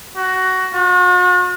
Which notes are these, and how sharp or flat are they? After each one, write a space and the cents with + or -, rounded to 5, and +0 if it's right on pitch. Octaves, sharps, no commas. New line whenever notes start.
F#4 +15
F#4 -45